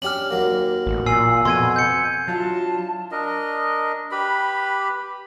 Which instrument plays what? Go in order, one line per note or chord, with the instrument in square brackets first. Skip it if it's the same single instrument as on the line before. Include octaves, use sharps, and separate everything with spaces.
[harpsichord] C#4 D4 G4 [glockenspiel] F6 F#7
[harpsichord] D#2 F#3 A#3
[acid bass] A1
[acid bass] A#2 [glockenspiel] G#5 E6 C7
[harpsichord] F2 [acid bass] B2 [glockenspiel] C6 G#6 D#7
[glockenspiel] G6 C#7
[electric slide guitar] F#3 [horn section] D4 E4 F4 [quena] A5
[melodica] D4 A#4 D#5
G4 B4 B5